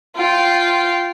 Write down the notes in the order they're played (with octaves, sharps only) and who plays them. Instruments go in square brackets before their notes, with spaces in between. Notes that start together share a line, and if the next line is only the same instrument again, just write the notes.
[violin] F4 G5